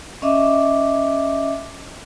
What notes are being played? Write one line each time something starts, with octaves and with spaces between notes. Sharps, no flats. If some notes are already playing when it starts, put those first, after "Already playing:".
C#4 D#5 E5 D6